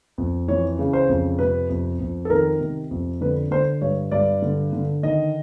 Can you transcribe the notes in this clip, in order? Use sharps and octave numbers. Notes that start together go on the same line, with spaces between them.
F2
E3 C#5
C#3
C5
F2
C3 B4
F2
F2
A4
D#3 A#4
C3
F2
D3 B4
D3 C5
G2 C#5
G2 D5
D3
D3
D#3 D#5